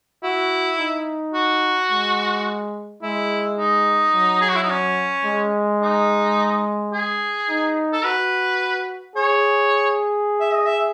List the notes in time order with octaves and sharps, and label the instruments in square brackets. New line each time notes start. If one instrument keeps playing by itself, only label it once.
[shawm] E4 [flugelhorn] F#4
[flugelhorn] D#4
[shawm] F#4
[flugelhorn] G#3
[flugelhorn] G#3 [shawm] E4
[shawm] D#4
[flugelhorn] F#3
[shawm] G#4
F#4
E4
D#4
C#4
[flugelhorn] G#3
[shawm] D#4
G#4
[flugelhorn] D#4
[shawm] A4
[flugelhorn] F#4 [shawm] B4
[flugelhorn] G#4 [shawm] C#5
[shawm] E5
D#5
E5